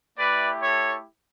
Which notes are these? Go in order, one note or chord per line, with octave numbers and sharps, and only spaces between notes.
A3 E4 G4 B4 D5
A4 C#5